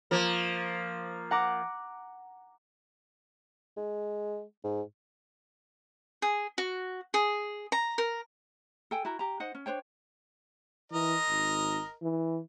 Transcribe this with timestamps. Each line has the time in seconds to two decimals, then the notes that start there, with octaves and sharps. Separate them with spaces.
0.11 F3 A#3
1.31 F#5 A#5 D6
3.77 G#3
4.64 G#2
6.22 G#4
6.58 F#4
7.14 G#4
7.72 A#5
7.98 A#4
8.91 A4 G5 G#5
9.05 E4 F#4 A#4
9.19 G4 A#5
9.40 D#4 C5 D#5 F#5
9.55 C#4
9.66 D4 C5 C#5 G5
10.92 E3 A#4 D#5
11.29 G#1
12.02 E3